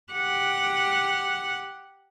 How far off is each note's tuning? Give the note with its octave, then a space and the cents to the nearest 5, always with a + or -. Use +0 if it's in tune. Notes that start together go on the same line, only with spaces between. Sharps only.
G4 +0 F#5 +0